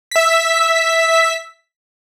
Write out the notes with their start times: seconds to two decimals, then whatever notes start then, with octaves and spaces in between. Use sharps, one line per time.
0.11 E5 B6